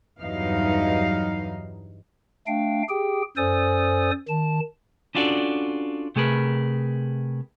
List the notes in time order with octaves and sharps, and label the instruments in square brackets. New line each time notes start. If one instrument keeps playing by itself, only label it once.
[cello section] E2 G2 E3 F#3 D#4 F5
[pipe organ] A3 D4 F5 G5
G4 G#4 G5
F#2 A4 C5 D5 G#5 D#6
D#3 A5
[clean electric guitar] C#4 D4 F4 F#4 A4 D5
C3 A3 G#4 A#4 B4